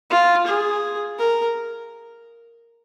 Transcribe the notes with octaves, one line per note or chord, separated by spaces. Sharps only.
F4
G#4
A#4